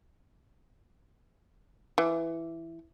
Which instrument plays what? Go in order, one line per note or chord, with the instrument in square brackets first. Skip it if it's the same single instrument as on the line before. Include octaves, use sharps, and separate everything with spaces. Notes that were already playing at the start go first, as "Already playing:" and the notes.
[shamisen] E3